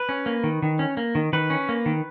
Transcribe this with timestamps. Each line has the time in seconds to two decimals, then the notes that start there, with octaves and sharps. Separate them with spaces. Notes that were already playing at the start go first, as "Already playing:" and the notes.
Already playing: B4
0.09 C#4
0.26 A#3
0.44 D#3
0.62 D#3
0.79 C#4
0.97 A#3
1.15 D#3
1.33 D#3 B4
1.50 C#4
1.69 A#3
1.86 D#3